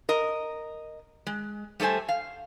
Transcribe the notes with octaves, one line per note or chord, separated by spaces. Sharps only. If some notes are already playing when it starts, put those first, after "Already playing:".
A#4 D#5
G#3
G3 A3 A4 C5 G#5
F5